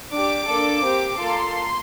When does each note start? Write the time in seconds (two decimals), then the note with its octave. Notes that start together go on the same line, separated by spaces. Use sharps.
0.12 D4 G4 D6
0.48 A#3 D4 A4
0.84 C4 G4
1.19 A#3 F4 A4 C6